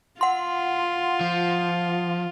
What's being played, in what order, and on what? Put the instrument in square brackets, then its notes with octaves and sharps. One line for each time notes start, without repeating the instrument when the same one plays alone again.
[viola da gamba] F4 [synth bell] F#5 C6
[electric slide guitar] F3